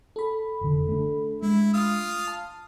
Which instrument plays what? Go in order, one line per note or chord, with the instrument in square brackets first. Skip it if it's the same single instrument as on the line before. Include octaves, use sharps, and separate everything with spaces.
[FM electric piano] A4 B5
[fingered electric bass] F1 D3
A3 D4
[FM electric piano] G#3 [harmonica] E4
[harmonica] F4 F5 D#6
[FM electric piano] A5